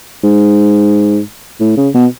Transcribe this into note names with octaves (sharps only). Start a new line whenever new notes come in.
G#2
A2
C#3
B2